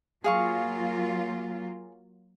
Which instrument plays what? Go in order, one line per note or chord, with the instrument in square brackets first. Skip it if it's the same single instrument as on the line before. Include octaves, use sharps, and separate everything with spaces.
[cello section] F#3 A#3 F4 [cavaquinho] G#4 F5 C#6